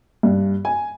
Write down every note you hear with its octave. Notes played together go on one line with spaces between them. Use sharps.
G2
G#5